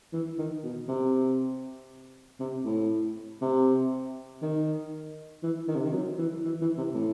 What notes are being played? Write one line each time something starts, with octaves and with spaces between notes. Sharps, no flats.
E3
D#3
B2
C3
C3
A2
C3
D#3
E3
D#3
C3
D#3
F#3
E3
E3
E3
C3
A2